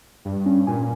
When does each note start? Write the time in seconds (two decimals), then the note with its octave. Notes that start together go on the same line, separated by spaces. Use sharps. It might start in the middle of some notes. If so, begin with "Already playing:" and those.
0.25 G2
0.46 C#4
0.67 A#2 G#5